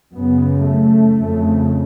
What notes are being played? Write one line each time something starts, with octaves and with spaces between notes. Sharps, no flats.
F#2 C#3 B3
A3
F2 C#3